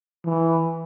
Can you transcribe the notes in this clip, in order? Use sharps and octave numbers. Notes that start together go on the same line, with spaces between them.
E3